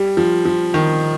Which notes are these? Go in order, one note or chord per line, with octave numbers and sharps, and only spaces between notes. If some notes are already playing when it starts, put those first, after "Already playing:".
Already playing: G3
F3
F3
D#3